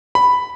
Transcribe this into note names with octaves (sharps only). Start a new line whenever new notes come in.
B5